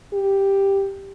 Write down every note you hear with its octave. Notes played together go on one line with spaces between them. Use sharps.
G4